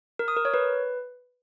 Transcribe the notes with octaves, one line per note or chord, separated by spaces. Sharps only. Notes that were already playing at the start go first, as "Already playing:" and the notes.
A#4
D#6
A#4
C#5
B4